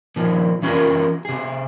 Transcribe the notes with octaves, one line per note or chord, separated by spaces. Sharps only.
A#2 D#3 F3
E3 C#4 F4 G4 A#4
C3 G#4